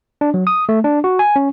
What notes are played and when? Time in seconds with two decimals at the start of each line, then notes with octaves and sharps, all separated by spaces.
0.21 D4
0.34 F#3
0.47 D#6
0.69 A3
0.84 D4
1.04 F#4
1.19 G#5
1.36 C#4